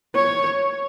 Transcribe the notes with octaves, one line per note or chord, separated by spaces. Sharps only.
C#5